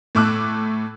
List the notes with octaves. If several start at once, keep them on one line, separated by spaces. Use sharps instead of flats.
A2 A3 D6 E6 F#6